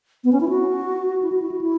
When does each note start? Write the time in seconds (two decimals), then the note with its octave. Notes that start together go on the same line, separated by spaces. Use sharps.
0.24 B3
0.32 C#4
0.41 E4
0.49 F#4
1.22 E4
1.32 F#4
1.42 E4
1.52 F#4
1.61 E4